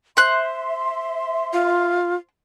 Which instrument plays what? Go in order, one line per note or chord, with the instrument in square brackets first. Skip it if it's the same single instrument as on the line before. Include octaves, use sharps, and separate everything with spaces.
[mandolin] C5 F#6 [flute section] E5 C6
[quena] F4